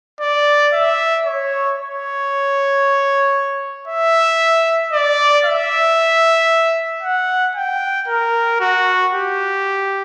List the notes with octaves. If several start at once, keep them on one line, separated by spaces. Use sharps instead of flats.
D5
E5
C#5
C#5
E5
D5
E5
F#5
G5
A#4
F#4
G4